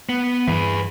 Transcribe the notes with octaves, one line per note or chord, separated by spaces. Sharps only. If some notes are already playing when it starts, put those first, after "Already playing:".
B3
G2 E3 G#4 B4